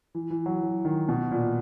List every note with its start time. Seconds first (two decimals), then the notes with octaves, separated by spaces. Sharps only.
0.15 E3
0.30 E3
0.46 F#3
0.62 E3
0.85 D#3
1.09 B2
1.32 A#2